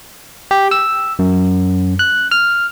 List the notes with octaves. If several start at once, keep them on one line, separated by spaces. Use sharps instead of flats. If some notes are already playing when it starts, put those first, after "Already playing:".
G4
E6
F#2
F#6
F6